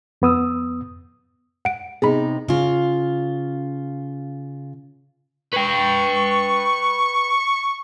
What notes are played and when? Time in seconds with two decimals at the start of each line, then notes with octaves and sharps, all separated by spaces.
0.22 F2 B3 D#6 E6
1.65 F#5 D7
2.02 C3 B3 D#4 G#4 B5
2.48 C#3 F4
5.54 B4 G5 C#6